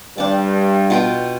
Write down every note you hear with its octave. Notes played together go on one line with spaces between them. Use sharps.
G2 D4 A5
B2 F4 G5